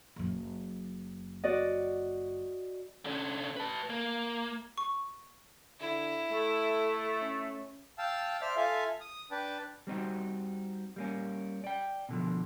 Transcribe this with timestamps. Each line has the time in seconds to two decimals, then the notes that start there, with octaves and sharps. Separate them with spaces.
0.16 F#1 F#3
1.44 F#4 D5 D#5
3.05 D3 C#4
3.57 B4 A5
3.90 A#3
4.78 C#6
5.80 D3 E4
6.32 A3 A4
7.21 C#4
7.98 F5 G5 A5 E6
8.42 C5 D5 E5 F6
8.57 F4 A4 E5 F5 G#5
9.01 D#6
9.31 D4 B4 G5 A5
9.87 G3 C4 D#4 F#4
10.96 G3 A#3 C#4
11.64 D5 G5
12.09 B2 D3 F3